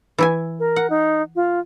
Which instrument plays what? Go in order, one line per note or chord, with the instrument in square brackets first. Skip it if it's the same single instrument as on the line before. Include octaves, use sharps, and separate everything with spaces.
[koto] E3 E4 G#5
[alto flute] A#4
[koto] F#5
[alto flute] D#4
F4